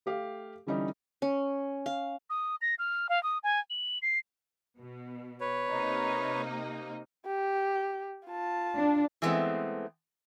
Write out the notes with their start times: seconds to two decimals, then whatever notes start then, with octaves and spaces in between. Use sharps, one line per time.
0.06 A3 G4 F5
0.67 D3 E3 G3 C#4 D#4
1.22 C#4
1.86 F5
2.30 D#6
2.61 A#6
2.79 F6
3.09 F5
3.23 D#6
3.43 G#5
3.70 F#7
4.02 C7
4.78 B2
5.41 B4 C#5
5.69 C3 A#3 D#4
7.26 G4
8.27 F4 A5
8.76 D4
9.22 E3 F#3 G#3 A3 B3 C4